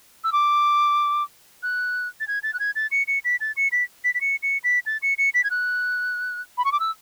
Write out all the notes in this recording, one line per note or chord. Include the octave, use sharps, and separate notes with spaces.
E6
D6
F#6
A6
G#6
A6
F#6
G#6
A6
C#7
C#7
B6
A6
C#7
B6
B6
B6
C#7
C#7
B6
A6
C#7
C#7
B6
G#6
F#6
B5
C#6
D6
E6